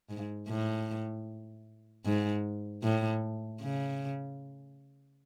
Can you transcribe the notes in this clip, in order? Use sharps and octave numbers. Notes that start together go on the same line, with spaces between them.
G#2
A2
G#2
A2
C#3